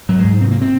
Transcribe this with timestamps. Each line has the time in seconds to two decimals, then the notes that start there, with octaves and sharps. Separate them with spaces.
0.09 G#2 F#3
0.19 G#2 G#3
0.40 C3 C4
0.51 A#3
0.61 C4